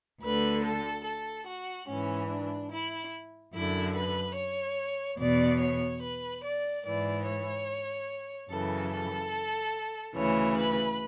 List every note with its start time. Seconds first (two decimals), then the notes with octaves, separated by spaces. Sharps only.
0.21 D2 D3 B4
0.63 A4
1.04 A4
1.46 F#4
1.87 G#2 E3 C#4
2.28 D4
2.70 E4
3.53 F#2 D3 E4
3.94 B4
4.35 C#5
5.18 E2 B2 D5
5.60 C#5
6.01 B4
6.43 D5
6.84 G#2 E3 D5
7.25 C#5
8.49 F#2 C#3 E3 A4
8.91 A4
10.15 D2 C#3 E3 C#5
10.56 B4